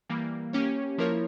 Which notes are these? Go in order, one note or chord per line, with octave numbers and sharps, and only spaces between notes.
E3 G3 A#3
A#3 C#4 G4 C#5
F3 A#3 E4 A#4 C#5